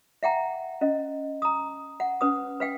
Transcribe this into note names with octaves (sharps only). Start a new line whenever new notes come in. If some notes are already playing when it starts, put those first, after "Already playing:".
E5 F#5 G5 A#5
C#4 D#5
A#5 D#6
F#5
C#4 B4 D#6
B4 F5 G5